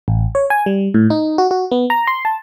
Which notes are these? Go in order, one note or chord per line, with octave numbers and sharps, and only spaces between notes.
A1
C#5
G#5
G3
A2
D#4
F#4
F#4
B3
A#5
C6
A5